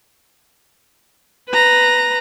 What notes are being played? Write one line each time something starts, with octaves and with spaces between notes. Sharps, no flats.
B4 A#5